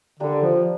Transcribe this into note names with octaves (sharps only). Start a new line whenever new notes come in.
D3 G3 A#3 D4 G4
F3